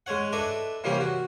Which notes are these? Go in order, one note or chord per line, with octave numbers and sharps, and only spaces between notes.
G#3 C#4 C#5 F#5
D4 A4 B4 D#5 E5 D6
C3 E3 G3 A#3 C#4 G4
F#4